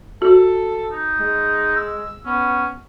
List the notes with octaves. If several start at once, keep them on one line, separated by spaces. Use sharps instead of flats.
F#4 A4
D#4
G#3
E6
B3 C#4